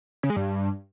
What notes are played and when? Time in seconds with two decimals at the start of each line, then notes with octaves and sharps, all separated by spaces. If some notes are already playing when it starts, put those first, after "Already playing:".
0.23 C#3
0.30 G#3
0.36 G2